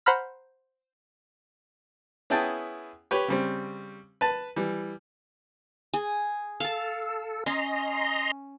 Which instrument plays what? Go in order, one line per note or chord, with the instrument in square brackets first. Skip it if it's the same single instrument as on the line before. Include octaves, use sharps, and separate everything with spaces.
[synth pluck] C5 F#5 A#5 B5 F6
[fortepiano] B3 C#4 E4 G#4 G5 A5
G4 B4 C#5
C#3 G3 C4
B4 A5
E3 G3
[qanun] G#4
[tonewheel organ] A4 [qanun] F5 A5
[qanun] C#4 [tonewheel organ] D#5 A#5 C6